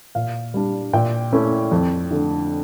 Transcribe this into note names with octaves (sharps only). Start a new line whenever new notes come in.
A#2 F5
G3 D4
A#2 G5
A3 C#4 E4
F2
D3 A3 D4